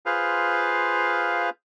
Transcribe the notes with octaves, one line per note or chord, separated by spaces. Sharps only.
F4 G#4 B4 C5 F5